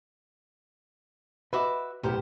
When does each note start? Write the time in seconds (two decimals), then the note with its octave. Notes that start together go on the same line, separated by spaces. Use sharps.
1.53 F#4 B4 D#5 E5 B5 D6
2.03 B1 A2 B3 G4 A#4 C5